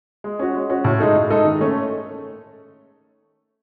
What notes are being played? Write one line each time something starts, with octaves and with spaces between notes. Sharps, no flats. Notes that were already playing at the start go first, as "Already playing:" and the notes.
G#3
C#4 F#4
G#3
C#4 F#4
A2
G#3 D#4 A4
A2
G#3 D#4 A4
D#3
A3 C#4